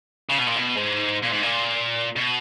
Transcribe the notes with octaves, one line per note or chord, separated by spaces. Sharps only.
C#3
B2
A#2
B2
G#2
A#2
G#2
A#2
B2